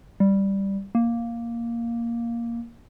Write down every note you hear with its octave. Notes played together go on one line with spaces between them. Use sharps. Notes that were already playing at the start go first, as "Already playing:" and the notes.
G3
A#3